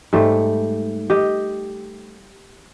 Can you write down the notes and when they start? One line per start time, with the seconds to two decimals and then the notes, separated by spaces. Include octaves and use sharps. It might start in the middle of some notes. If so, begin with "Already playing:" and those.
0.13 G#2 G3 A3
1.10 G4 D#5